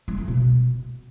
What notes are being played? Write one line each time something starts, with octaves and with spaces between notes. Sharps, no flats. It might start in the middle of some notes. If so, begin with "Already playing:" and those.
G#3
A3
B2